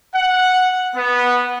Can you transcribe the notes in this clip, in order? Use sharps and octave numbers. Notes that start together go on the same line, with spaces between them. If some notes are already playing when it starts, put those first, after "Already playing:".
F#5
B3